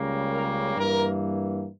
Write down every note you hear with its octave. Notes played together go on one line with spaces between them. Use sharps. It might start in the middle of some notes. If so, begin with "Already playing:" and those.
Already playing: C#2 C#3 G3 A#3
A#4
G2 E3 A#3 A#4